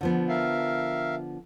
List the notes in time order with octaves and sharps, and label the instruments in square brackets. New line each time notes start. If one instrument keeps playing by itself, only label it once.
[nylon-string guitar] D3 F3 B3
[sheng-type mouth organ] A#4 E5 F5